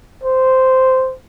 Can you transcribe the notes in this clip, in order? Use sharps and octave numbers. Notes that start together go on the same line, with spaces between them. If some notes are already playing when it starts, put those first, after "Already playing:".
C5